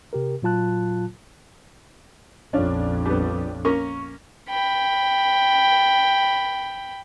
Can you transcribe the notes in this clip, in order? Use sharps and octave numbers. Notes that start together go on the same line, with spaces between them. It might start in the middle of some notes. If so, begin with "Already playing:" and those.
C3 G4 A#4
A#2 F#3 F4 A5 F#6
A#1 F2 C#4 D4 F4
G3 B3
A#3 C#4 A#4 C#6
G5 B5